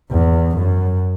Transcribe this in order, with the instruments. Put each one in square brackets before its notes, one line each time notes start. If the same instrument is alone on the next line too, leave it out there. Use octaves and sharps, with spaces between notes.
[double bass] E2
F#2